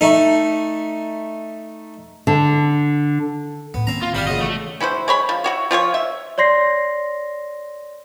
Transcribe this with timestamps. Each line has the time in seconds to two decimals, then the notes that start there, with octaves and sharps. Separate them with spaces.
0.01 A3 D#4
2.27 D3
3.74 D2 A2 B3
3.87 D#3 A#3 C4 C#4 A#5
4.02 F4
4.14 G1 B2 G3 C4 G4 F5
4.27 A#2 C#3 F#4 D#5
4.41 E3 A3
4.80 C#4 E4 F#4 C5
5.08 G#3 C#5 B5
5.29 F3
5.44 E4 F#4 C#5
5.71 F3 F4 G#4 C#5
5.94 E5
6.38 C#5 D5 C6 A#6 C7